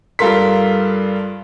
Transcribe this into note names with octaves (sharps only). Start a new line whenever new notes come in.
G2 F4 A4 A#4 C6 B6